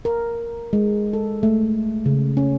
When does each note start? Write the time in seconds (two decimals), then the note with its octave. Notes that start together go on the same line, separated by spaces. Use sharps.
0.05 A#4
0.73 G#3
1.13 A4
1.43 A3
2.06 C#3
2.37 C#4